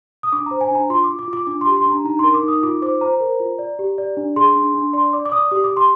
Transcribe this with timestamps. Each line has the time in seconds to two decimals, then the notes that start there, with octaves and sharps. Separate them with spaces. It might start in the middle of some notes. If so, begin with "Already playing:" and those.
0.23 D#6
0.32 D4 D6
0.46 C5 A#5
0.61 G#5
0.71 D4 A#5
0.90 F4 C6
1.04 F4 D6
1.19 D6
1.28 F4
1.33 D6
1.47 D4 D6
1.61 C6
1.67 G4
1.77 C6
1.86 D4
1.91 A#5
2.05 D#4 A#5
2.19 A#4 C6
2.34 D6
2.43 D#4
2.48 D#6
2.63 F4 D6
2.82 C5 D6
3.01 C5 A#5
3.20 A#4
3.40 F4
3.59 D5
3.79 G4
3.98 D5
4.17 D4
4.36 G#4 C6
4.56 D4
4.74 D4
4.93 D5 C6
5.13 D5 D6
5.25 D6
5.32 D5 D#6
5.51 G4 D#6
5.64 D6
5.71 G4
5.77 C6